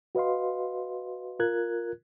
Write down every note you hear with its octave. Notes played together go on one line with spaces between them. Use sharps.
F#4 B4 D#5 F5 C6
F4 A#4 F#6 G#6